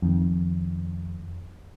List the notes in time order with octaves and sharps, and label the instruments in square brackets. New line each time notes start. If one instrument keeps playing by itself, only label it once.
[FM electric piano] F2 D#3